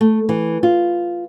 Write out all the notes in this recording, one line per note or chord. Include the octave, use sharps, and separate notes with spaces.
A3
E3
F4